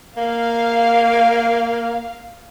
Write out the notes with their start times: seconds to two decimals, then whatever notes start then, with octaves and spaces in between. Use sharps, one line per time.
0.17 A#3 F5